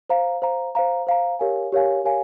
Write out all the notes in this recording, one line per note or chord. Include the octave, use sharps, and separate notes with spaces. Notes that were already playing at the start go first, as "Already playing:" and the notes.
C5 F5 A#5
C5 F5 A#5
C5 F5 A#5
C5 F5 A#5
G4 A#4 C#5 F5 G#5
G4 A#4 C#5 F5 G#5
G4 A#4 C#5 F5 G#5